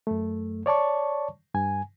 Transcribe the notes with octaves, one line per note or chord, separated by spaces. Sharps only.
F#2 A3
C#5 D5 A5 C#6
G2 G#5